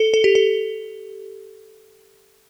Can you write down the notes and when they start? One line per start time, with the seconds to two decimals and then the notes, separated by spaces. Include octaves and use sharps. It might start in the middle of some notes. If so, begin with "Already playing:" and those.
Already playing: A4
0.14 A4
0.24 G4
0.35 A4